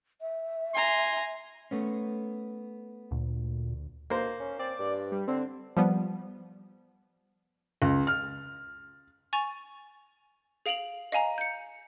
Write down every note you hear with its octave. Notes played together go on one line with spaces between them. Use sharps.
E5
G#5 A#5 C6
A3 B3 C#4
D2 A#2
B2 A#3 C5
C#4
C4 D5
G2
G3
D3 C4
F3 G3 B3
C#2
F6
G#5 C#6 A6 F7
G#4 F5 D7 F7 F#7
D#5 F5 G#5 A#5
G6 C#7